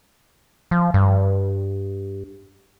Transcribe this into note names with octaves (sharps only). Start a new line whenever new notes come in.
F3
G2